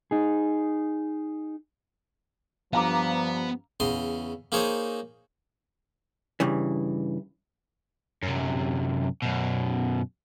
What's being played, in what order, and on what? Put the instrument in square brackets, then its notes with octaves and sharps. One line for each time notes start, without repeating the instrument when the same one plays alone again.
[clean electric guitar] D#4 G#4
[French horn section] G2 F3 [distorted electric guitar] B3 [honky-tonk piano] F5 A#5 D6
[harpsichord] E2 C#3 D#5 C6
A#3 D#4 G#4 C5 C#5 D#5
[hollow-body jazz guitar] G2 C#3 E3
[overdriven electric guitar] F#2 C3
F#2 B2